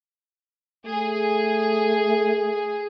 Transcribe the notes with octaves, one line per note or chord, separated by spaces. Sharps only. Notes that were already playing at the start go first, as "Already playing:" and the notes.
A3 G#4